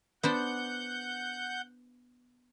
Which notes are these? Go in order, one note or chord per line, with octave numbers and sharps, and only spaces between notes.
B3 D4 C5 F#5 G6